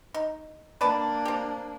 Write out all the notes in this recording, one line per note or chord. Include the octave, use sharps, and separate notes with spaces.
D#4
A#3 D4 B4 D5 A5
C4 G4